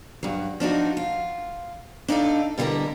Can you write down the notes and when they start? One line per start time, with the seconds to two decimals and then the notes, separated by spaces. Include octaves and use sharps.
0.23 G2 F#3
0.60 F3 D4 D#4 F#4
0.97 F4
2.08 D4 D#4 F4 A4
2.58 B2 D3 G3 E4 A#4